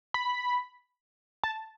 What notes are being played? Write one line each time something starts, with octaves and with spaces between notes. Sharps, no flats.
B5
A5